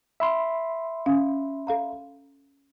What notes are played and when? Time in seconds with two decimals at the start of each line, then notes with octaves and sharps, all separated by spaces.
0.20 E5 B5 C6
1.06 C#4 F5
1.67 A4 F5 A#5